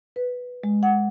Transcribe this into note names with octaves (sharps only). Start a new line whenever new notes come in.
B4
G#3
F#5